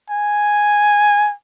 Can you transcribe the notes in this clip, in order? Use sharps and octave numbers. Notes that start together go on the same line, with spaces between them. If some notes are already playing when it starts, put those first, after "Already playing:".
G#5